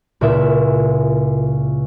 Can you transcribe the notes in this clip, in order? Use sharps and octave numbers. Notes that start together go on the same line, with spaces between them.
C#2 A#2 E4 E5